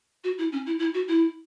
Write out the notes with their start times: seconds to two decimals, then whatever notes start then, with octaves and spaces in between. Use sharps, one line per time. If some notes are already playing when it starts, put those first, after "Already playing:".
0.24 F#4
0.38 E4
0.52 C#4
0.66 E4
0.79 E4
0.94 F#4
1.08 E4